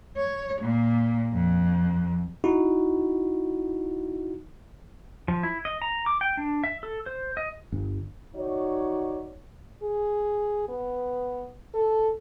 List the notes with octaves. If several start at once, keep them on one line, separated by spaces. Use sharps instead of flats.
C#5
A#2
F2
D#4 E4 F#4
F3
E4
D#5
A#5
D6
G5
D4
E5
A4
C5
D#5
G1
D#3 D#4 F#4 C#5 D5
G#4
B3
A4